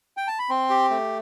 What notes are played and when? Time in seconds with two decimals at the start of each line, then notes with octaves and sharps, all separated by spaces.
0.17 G5
0.28 A5
0.39 B5
0.50 C4 C6
0.70 G4
0.90 A3